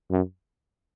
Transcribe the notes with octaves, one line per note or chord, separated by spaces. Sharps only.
F#2